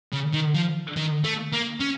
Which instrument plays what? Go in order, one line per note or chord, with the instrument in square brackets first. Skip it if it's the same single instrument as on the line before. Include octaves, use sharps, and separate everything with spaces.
[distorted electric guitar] C#3
D#3
F3
D#3
A3
A#3
C#4